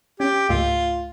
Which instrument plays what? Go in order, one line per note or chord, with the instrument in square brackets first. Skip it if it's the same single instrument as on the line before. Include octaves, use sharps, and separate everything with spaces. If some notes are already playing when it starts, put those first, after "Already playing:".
[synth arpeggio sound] C#4 [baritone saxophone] G4
[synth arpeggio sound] C#2 G#2 A3 [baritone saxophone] F4